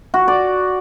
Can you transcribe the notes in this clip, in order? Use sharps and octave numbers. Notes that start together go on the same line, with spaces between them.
F#4
D5